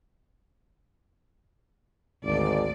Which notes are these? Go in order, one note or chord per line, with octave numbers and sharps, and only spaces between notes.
G#1 D2 D5